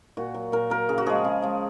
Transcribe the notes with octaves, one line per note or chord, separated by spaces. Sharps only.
A#2 F#4
F#3
A#2 A#4
F#3 A#4
C#3 G#4
F#4
F3 G#3 G#4
C#3
F3 G#3